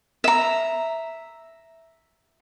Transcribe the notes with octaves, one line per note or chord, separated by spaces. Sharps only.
E5 A#5